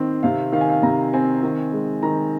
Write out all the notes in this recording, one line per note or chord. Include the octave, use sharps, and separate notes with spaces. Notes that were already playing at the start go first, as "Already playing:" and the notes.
Already playing: D#3 C4
C3 F5
D#3 F5
G#5
F5
C3 A#5
C4 G#5
D#3
G#3
D#3 A#5